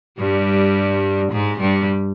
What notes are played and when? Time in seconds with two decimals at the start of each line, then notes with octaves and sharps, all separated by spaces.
0.19 G2 G3
1.32 G#2 G#3
1.60 G2 G3